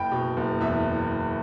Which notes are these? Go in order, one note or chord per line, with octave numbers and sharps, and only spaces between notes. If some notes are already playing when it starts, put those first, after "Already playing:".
Already playing: F#1 G5 B5
B2
F#1
E2 E5